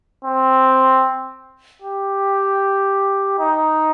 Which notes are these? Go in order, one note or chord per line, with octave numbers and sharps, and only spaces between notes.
C4
G4
D#4